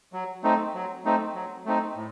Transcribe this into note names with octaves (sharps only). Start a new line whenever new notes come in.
F#3
A3 C4 D#4
F#3
A3 C4 D#4
F#3
A3 C4 D#4
A2